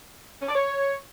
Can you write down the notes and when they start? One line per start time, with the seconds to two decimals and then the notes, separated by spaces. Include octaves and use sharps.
0.42 C#4
0.48 D5
0.55 C#5